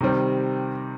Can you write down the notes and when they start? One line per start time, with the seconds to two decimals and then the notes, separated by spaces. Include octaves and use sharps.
0.01 C3 D#3 G3 C4